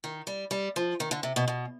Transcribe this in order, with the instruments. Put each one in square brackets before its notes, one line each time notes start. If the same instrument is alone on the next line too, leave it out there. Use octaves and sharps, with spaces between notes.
[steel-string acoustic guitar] D#3
G3
G3
F3
D#3
D3
C3
B2
B2